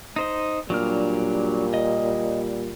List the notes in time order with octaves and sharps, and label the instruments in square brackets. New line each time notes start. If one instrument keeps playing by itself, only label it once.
[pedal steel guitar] D#4 C5 D#5
[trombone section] A#2 G3 [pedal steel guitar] F#3 D4 F6
[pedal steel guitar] D#5